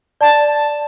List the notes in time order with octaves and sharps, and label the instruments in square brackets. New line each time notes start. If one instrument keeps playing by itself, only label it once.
[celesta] D5 [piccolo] A5